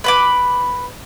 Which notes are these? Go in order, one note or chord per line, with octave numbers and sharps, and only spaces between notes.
B4 B5 D6